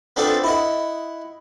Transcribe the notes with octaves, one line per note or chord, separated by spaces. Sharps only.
A3 B3 C4 D4 F4 A4
E4 D#5 F#5